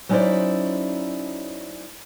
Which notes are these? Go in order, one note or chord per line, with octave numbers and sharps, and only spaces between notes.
F#3 C#4 D#4 E4 C5 D5